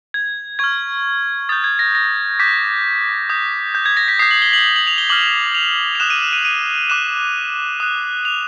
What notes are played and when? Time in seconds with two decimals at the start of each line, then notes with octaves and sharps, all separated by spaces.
0.14 G#6
0.59 C#6 F6 G#6
1.49 D#6 G6 A6
1.64 G#6
1.79 A#6
1.95 A#6
2.39 D6 G6 B6
3.30 D#6 G6
3.75 G6
3.86 G#6
3.97 A#6
4.08 B6
4.19 D#6 G6 C7
4.31 F#7
4.42 G7
4.53 F#7
4.65 F#7
4.76 F#7
4.87 F7
4.98 G7
5.09 D6 F6 F#7
5.55 F7
5.95 F7
6.00 D#6 F#6 E7
6.10 D#7
6.23 E7
6.33 D#7
6.45 D#7
6.90 D6 F#6 E7
7.80 D#6 F#6
8.25 F7